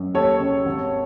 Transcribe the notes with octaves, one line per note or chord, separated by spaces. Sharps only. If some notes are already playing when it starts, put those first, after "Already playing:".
Already playing: F#2
D#2 A4 C#5
C#3
G#1